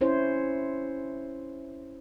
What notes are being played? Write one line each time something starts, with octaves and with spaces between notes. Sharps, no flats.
C#4 E4 C5 C#5